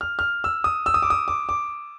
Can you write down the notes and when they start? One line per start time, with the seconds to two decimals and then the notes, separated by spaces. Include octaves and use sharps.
0.01 F6
0.19 F6
0.44 E6
0.64 D#6
0.86 E6
0.94 D#6
1.02 D6
1.10 D#6
1.28 D6
1.49 D6